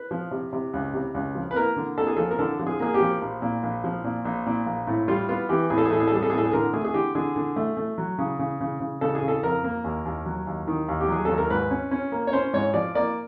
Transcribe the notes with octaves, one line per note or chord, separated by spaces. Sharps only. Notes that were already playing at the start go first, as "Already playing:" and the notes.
Already playing: B4
F3
C3
C3
C#2
C3
C#2
F3
B4
A#3 A#4
D3
A#3 A4
G#4
F3 A4
A#4
D3 A4
F3
G#4
A#3 G#4
G4
F3
A#1
A#2
A#1
F3
A#2
A#1
A#2
A#1
A2
G3 F4
B3 F4
E3 G4
A2 G#4
A4
G#4
A2 A4
G#4
A4
G3 G#4
A4
G#4
A2
A4
G#4
D3 A#4
A3 G#4
G#4
D3 G4
D3 G#4
D3
A3
A3
F#3
C#3
C#3
C#3
C#3
C#3 A4
G#4
C#3
A4
F2 A#4
A#3
D#2
D#2
F#3
D#2
D#3
D#2
G4
F#3 G#4
D#2 A4
A#4
G#2 B4
C#4
C#4
A#3
C#5
C#4 C5
G#2 C#5
F3 D5
A#3 D5